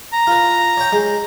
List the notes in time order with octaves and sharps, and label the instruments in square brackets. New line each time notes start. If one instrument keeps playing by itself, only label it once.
[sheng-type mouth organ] A#5
[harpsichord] F4 B4
C#5 G5
G#3